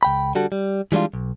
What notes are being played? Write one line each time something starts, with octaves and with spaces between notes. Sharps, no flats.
C#2 G5 B5
D3 G3 F#4 A4
G3
E3 G3 G#3 D4 F4
B1